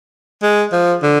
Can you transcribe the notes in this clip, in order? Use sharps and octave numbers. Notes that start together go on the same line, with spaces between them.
G#3
F3
D3